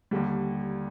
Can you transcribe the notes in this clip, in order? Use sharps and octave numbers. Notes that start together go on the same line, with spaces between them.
D#2 D3 G3